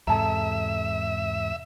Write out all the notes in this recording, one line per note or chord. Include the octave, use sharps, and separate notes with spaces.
E2 G#2 C3 A4 E5 A5 A#5